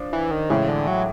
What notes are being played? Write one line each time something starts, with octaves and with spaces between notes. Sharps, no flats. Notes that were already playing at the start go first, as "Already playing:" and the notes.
Already playing: F3 D4
E3
D#3
A2 C#3 E3 G#3
D3
F#3